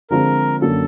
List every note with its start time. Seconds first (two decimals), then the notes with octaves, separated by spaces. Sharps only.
0.10 D3 F3 G#3 C4 F4 A#4
0.61 F#2 D3 F#3 A#3 A4